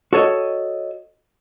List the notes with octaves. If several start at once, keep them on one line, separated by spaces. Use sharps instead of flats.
F#4 A4 C#5 D#5